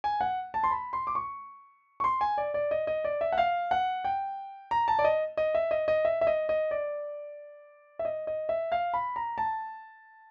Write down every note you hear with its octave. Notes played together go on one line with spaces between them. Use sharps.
G#5
F#5
A5
C6
B5
C6
D6
C#6
C#6
C6
G#5
D5
D5
D#5
D#5
D5
E5
F#5
F5
F#5
G5
A#5
A5
D5
D#5
D#5
E5
D#5
D#5
E5
E5
D#5
D#5
D5
E5
D#5
D#5
E5
F5
B5
A#5
A5